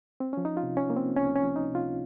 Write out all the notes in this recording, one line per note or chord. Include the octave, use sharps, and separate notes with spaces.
C4
F3 C#4
D#4
F4
C3
C#4
A#3
C4
C#2 C#4
C#4
F3
D#4
C3
F4